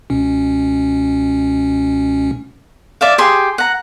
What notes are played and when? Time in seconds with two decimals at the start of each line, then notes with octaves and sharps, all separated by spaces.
0.10 C#2 B2 C#4
3.01 D5 E5 F5
3.18 G4 G#4 C6
3.58 F#5 A#5